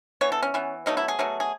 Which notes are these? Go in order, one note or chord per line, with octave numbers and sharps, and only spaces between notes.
E3 B3 C#5
A4
C#4
E3 B3
B2 F#3 A3 D#4
E4
G#4
B2 F#3 A3
G#4